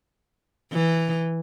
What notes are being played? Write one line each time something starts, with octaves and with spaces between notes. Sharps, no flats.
E3